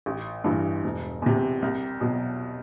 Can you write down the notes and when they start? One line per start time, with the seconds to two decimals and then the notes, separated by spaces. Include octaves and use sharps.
0.06 A1
0.44 G2 E3
0.84 E1
1.22 E2 C3
1.62 C2
2.01 B2 F#3